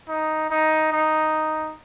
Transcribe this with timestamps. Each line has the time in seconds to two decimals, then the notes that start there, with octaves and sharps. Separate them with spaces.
0.08 D#4
0.50 D#4
0.93 D#4